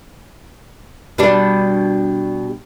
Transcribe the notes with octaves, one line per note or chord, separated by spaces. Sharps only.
B2 G3 D4